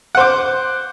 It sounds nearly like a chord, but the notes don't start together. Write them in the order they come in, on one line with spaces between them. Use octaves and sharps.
F#5 C5 D6